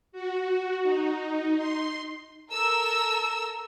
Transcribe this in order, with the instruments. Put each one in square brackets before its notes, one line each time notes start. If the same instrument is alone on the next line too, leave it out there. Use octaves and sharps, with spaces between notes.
[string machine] F#4
D#4
C6
[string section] A4 A#4 E6